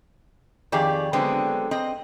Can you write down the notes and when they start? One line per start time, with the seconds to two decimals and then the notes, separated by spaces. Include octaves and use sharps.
0.72 F2 D#3 G4 G#4 D5
1.13 D3 F#3 G#3 B3 C4
1.71 C4 D#5